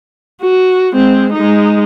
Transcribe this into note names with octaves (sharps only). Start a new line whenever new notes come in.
F#4
G#3 C4
G#3 D#4